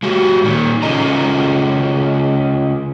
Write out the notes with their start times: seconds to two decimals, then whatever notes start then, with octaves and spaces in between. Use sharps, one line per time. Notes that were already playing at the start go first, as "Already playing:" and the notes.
0.03 G#3 F#4 G4
0.44 A#2 D#3
0.82 C#3 C#4 F4 A4 D#5 A#5